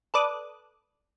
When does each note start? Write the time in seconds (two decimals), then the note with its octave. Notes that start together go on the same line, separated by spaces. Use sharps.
0.14 A4 B4 D5 D6 D#6 F#6